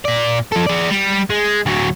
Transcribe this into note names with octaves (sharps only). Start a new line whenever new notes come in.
A#2 D5
F3 A4
G#4 D5
G3
G#3
D2 F#3